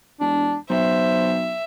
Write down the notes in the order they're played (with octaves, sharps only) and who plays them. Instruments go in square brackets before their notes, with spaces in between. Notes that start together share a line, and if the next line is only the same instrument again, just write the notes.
[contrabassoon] E1 [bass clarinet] D4
[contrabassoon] B1 [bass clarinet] C5 [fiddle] E5